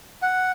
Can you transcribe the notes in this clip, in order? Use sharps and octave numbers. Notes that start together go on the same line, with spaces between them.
F#5